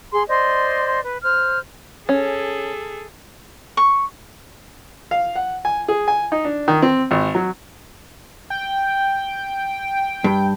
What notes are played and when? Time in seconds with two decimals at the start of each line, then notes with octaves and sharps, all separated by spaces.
0.11 G#4 C6
0.28 C5 D5 D#5 C6
1.03 B4
1.22 C5 F6
2.09 C#4 G#4 A4
3.77 C#6
5.11 F5
5.35 F#5
5.65 G#5
5.88 G#4
6.08 G#5
6.32 D#4
6.45 D4
6.68 D#3
6.82 C4
7.11 G#1
7.35 F#3
8.50 G5
10.24 G2